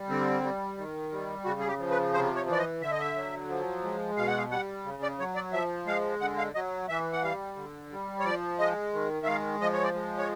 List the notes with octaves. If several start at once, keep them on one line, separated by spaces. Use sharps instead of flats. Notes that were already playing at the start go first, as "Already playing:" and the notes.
Already playing: G3
D3 C4
G3
D#3
G3
C#3 F#4
G#4
G4
F3
B4
C3 C5
C#5
E3 D5
D#5
D3 E5
D#5
E5
F#3
F3
G#3
B2 F5
F#5
F5
G3 F#5
C#3
D5
F#3 C#5
D5
F3 E5
G#3 F5
D3 F#5
F5
F#3 D#5
E3 E5
F#5
G3 F5
D3
G3
C#5
F3 D5
G#3 D#5
D#3
E5
G#3 F5
F3 D#5
C#5
D5
G#3
C#5